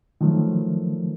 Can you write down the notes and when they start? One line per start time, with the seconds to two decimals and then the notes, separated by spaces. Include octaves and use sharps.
0.21 D#3 F3 F#3 A3